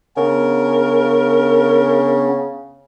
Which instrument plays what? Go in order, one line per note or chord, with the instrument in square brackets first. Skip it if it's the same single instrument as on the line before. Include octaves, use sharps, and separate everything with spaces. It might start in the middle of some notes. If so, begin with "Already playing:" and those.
[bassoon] C#3 [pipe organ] B3 C#4 D4 [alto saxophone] A#4